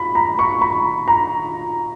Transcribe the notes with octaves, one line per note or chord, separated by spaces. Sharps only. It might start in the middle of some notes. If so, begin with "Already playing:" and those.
Already playing: B5
A#5
C#6
B5
A#5